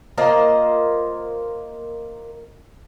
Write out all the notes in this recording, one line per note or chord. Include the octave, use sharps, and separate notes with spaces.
A#3 F4 C5 D#5